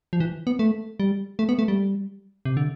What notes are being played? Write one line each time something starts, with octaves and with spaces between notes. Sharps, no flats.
F3
E3
B3
A3
G3
A3
B3
A3
G3
C3
D3